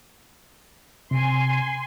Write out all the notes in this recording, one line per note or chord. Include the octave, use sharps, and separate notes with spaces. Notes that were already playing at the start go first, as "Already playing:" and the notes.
C3 G#5 C6